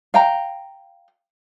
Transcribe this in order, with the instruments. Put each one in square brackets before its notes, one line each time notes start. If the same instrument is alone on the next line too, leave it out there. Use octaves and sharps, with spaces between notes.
[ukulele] F5 G5 A#5